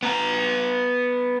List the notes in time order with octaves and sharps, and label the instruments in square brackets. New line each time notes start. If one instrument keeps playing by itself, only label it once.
[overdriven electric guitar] B3 A#5